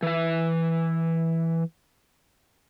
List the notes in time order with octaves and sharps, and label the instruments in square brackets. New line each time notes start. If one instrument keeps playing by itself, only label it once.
[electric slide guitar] E3 E5